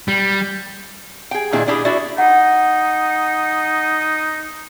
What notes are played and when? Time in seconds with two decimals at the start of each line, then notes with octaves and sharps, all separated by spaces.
0.08 G3
1.31 G#4 G5
1.52 A#2 D#3 D4 E4 G#4
1.68 D4 E4 G4 G#4
1.85 D4 E4 F#4 D5 E5
2.18 D#4 F#5